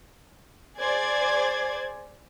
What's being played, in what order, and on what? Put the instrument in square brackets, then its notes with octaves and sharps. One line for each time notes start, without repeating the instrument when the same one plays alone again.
[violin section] G#4 C5 D5 G#6